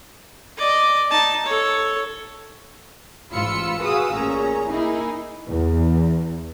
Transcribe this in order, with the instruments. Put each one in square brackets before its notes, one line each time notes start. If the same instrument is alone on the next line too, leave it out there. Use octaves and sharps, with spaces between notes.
[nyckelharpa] D5 D#5
D#4 A5
A4 C#5
[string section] A1 G#2 F4 B5 E6 C#7
F#4 G#4 B4 F5 D#6 E6
A1 A#2 C#4 G#4 A#5
A#3 D#4 E4 G#4
[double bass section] E2